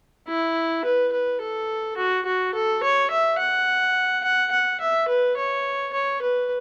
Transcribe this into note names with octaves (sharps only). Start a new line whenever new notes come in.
E4
B4
B4
A4
F#4
F#4
A4
C#5
E5
F#5
F#5
F#5
E5
B4
C#5
C#5
B4